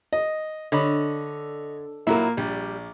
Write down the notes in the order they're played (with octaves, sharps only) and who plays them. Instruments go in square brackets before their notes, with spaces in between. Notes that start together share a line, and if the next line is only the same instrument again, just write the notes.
[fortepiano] D#5
[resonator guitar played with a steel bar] D3 [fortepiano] C#5 D#5 B5
[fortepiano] A#2 A#3 [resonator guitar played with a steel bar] F#3 E4
[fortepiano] A#1 [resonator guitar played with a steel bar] G3